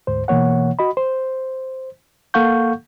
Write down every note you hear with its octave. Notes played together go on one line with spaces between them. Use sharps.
D2 G#2 C5
B2 E3 A#3 C#5 F#5
F#4 D#5 B5
C5
A#3 A4 F5 F#5 C#6 G6